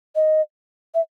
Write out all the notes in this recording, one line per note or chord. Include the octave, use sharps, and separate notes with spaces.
D#5
E5